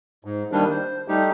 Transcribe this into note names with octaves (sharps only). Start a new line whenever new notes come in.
G#2
D#3 G3 A#3 D4
C5
G3 A3 D#4 G4